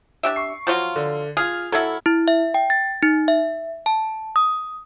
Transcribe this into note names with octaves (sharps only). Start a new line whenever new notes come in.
D4 G4 E5
C#6 C7
F3 F#3 F4
D3
F4 G#4 F6
F#3 E4 A4 G#6
E4
E5
G5
A6
D#4
E5
A5
D#6